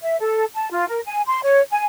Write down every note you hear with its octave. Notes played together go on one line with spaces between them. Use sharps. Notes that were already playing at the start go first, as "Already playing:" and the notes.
E5
A4
A5
F4
A#4
G#5
C6
C#5
G#5